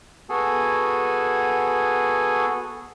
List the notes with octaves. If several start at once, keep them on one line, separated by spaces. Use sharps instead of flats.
B3 F#4 G#4 A4 G#5